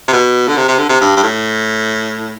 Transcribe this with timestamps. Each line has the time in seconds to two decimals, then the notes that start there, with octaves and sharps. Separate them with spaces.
0.08 C3
0.13 B2
0.48 D3
0.57 C3
0.68 C3
0.79 D3
0.89 C3
1.01 G2
1.17 G2
1.23 A2